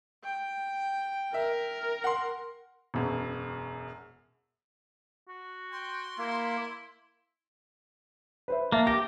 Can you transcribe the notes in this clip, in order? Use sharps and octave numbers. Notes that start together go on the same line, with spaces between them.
G5
A#4 E5
F#5 C6
E1 F#2
F#4
G5 C6
A#3 E4
B4 C5 E5
A#3 E5 A5 A6
G4 A#6